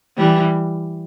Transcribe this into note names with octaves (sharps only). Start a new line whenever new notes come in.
E3 G3